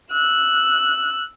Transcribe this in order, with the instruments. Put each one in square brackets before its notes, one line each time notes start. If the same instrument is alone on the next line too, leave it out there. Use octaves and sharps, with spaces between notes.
[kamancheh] E6 F#6